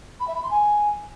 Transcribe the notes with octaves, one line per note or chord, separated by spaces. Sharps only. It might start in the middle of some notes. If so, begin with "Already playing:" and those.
B5
E5
B5
C6
G#5